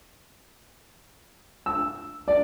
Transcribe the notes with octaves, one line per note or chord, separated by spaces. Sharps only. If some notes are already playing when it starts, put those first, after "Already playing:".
E6
D5